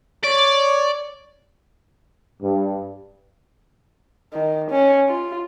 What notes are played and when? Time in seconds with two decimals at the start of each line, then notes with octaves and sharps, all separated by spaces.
0.24 C#5 D5
2.42 G2
4.34 D#3
4.71 C#4
5.09 F4